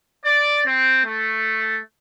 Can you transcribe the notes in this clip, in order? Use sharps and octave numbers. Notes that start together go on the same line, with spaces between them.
D5
C4
A3